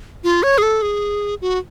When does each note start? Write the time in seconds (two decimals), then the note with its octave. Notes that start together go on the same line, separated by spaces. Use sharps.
0.24 F4
0.43 C#5
0.58 G#4
0.62 A4
0.82 G#4
1.41 F#4